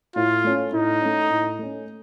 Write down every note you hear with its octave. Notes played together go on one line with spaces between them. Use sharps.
A2 F4
A3 C#4
A2 D#4
A3 C#4
A2
A3 C#4